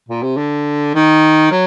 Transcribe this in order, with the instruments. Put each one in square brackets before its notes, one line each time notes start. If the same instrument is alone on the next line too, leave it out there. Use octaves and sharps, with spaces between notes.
[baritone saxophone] A#2
C3
D3
D#3
F#3